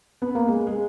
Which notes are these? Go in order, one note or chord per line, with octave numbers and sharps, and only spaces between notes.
B3
A#3
G#3
G#3